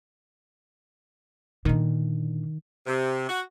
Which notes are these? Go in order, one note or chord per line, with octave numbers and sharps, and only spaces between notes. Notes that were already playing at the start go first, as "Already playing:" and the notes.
A#2 D3 D#3
C3
F#4